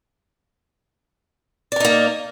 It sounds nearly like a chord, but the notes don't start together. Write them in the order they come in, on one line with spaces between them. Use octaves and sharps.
D5 A#4 D#4 A#3